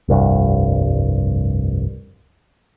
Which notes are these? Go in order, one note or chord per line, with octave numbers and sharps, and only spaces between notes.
F1 C2 G2